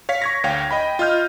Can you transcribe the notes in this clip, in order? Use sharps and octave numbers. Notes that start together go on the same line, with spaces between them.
C#5 F5 B6
C#6 G#6 A#6
D2 C#5 F5 G5 A#6
D#5 G5 B5
F4 D#5 F6 G6